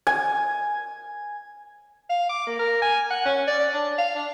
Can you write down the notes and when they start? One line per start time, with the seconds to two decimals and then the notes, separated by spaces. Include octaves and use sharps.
0.07 G#5
2.10 F5
2.29 D6
2.47 A#3
2.59 A#4
2.82 G#5
3.11 F#5
3.25 C#4
3.47 D5
3.74 D4
3.98 F5
4.15 D4